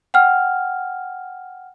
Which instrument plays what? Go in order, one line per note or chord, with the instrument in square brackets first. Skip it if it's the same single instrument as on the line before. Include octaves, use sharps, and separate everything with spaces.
[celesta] F#5 G5 F6